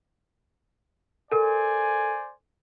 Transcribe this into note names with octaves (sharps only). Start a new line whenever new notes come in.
A4 A#4 C5 D5 G#5